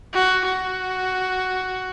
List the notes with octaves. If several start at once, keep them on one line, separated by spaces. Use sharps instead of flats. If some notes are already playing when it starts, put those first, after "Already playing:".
F#4
F#4